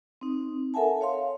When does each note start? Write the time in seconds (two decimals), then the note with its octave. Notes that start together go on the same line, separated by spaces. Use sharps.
0.21 C4 D#4
0.74 A4 A#4 E5 F#5 G#5 A5
1.01 C#5 F5 C6